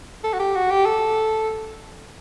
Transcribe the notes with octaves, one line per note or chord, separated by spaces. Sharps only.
A4
F#4
G4
F#4
G4
A4